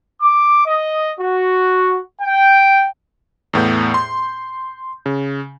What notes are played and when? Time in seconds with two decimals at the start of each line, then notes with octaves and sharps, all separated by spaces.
0.21 D6
0.66 D#5
1.20 F#4
2.21 G5
3.53 E2 A2 B3 G6
3.94 C6
5.06 C#3